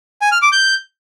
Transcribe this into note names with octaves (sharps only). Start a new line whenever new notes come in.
G#5
F6
D6
G6